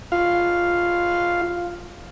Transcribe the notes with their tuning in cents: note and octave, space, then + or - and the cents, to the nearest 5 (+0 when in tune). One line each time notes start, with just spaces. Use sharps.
F4 +0 F5 +0